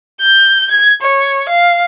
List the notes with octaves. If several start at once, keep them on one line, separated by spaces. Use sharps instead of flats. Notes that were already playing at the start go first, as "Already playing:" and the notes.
G6
G#6
C#5
F5